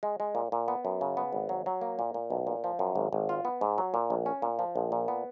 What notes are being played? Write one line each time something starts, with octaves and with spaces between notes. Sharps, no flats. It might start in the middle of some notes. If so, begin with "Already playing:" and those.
G#3
G#3
A#2
A#2
B3
F#2
C#3
B3
G#1
F#3
F#3
A#3
A#2
A#2
B1
A#2
F3
F#2
G#1
G#1
F4
B3
G#2
F#3
A#2
A#1
C#4
A#2
F3
A#1
A#2
B3